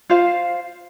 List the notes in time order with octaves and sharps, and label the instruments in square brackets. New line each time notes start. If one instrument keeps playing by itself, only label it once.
[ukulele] F4 C5 F5